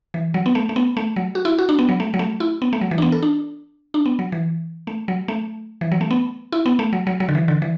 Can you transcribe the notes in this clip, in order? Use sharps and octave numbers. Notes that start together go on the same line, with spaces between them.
E3
F#3
B3
A3
A3
B3
A3
F#3
F#4
E4
F#4
D4
B3
F#3
A3
F#3
A3
E4
B3
A3
F#3
E3
D4
B3
A4
D4
D4
B3
F#3
E3
A3
F#3
A3
E3
F#3
A3
B3
E4
B3
A3
F#3
F#3
F#3
D3
E3
D3
E3